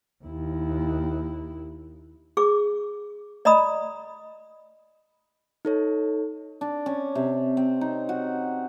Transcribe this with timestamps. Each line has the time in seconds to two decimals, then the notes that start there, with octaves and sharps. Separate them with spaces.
0.24 D#2 E4
2.37 G#4 D6
3.45 D5 D#5 A#5 B5 D#6
5.65 D#4 A4 C#5
6.61 D4
6.86 C#4
7.15 C3
7.57 C4
7.81 D#4
8.09 F#4